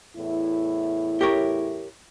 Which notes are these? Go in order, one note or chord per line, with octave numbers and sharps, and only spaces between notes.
E2 A2 E4
G4 A#4 C#5